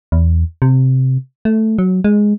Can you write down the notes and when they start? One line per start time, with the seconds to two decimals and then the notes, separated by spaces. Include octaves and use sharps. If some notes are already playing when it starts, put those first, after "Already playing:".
0.12 E2
0.62 C3
1.45 A3
1.79 F#3
2.04 G#3